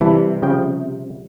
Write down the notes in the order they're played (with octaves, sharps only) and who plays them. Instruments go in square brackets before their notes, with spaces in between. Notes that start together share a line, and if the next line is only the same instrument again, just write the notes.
[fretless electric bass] C3 [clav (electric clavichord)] E3 E4 A5 [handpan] G3
[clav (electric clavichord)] C#3 F3 G5